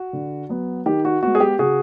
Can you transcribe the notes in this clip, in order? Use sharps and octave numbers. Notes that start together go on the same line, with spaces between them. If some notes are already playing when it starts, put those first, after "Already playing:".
Already playing: F#4
D3
F#3 B3
D#3 G4
F#4
G#3 B3 F#4
G#4
G4
C#3 F#4 G#4